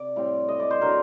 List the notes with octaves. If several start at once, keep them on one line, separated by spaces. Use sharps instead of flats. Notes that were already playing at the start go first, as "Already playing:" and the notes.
Already playing: C3 D5
A2 G3 C4
D#5
D5
C5
D3 F#3 C4 A#4